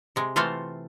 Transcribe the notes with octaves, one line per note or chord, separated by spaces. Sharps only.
C3 G#3
E3 A3 C4 F4 A4 F5